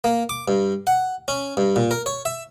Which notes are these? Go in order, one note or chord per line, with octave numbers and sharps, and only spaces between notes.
A#3
D6
G2
F#5
C#4
G2
A#2
A#4
C#5
E5